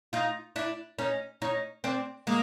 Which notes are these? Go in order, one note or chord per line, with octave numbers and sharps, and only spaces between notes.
D#4 F4
D4 E4
C#4 D#4
C#4 D#4
C4 D4
G#3 A#3